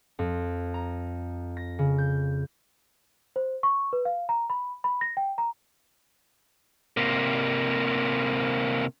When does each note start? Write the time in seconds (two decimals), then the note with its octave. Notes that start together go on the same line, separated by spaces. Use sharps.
0.19 F2
0.74 A#5
1.57 A#6
1.79 C#3
1.98 G6
3.36 C5
3.63 C#6
3.93 B4
4.05 F5
4.29 A#5
4.50 B5
4.84 B5
5.01 A#6
5.17 G5
5.38 A#5
6.97 C3 A#3